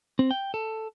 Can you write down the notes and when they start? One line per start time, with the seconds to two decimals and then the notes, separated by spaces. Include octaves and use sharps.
0.19 C4
0.31 G5
0.54 A4